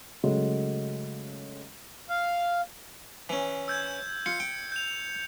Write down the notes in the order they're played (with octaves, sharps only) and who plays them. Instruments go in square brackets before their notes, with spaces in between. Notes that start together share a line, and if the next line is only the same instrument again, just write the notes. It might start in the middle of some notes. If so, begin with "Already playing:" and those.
[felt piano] C#3 F#3 G#3 A3
[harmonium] F5
[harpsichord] E3 C#4
[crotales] E6 G6 G#6
[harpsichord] F4 [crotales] C#7
[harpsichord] G5
[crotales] G6 F7